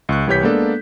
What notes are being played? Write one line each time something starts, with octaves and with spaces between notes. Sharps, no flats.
C#2 C#6 F#6
C2 E3 G4 C#5 G6 B6
G#3 A#3 B3 D4 A4 D5